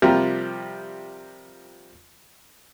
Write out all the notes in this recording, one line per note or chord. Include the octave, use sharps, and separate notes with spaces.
C3 F3 G3 F4 A#4